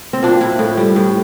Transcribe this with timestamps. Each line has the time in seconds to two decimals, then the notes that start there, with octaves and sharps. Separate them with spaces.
0.13 C4
0.23 A#2 D4
0.41 A#2 E4
0.59 A2
0.77 G3
0.96 A2